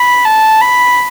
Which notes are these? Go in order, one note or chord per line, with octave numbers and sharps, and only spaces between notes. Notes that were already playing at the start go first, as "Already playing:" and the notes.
Already playing: B5
A5
B5